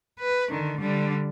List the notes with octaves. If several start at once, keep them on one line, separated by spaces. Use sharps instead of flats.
B4
D3 D#3
D3 G3